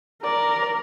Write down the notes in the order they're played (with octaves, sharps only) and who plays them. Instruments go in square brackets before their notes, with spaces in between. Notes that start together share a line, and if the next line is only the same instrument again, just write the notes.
[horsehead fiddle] A#4 [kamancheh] D5